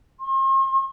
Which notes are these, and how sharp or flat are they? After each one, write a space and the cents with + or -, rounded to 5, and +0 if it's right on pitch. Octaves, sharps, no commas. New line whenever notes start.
C6 +40